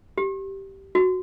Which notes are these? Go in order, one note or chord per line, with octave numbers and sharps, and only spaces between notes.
G4
F#4